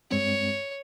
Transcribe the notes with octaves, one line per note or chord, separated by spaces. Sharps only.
G2 G#3 C4 C#5